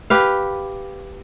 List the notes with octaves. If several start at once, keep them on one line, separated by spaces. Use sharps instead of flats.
G4 B4 F5